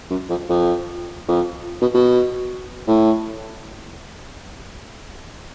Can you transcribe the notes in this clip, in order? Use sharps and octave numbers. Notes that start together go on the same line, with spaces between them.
F#2
F2
F2
F2
B2
B2
A2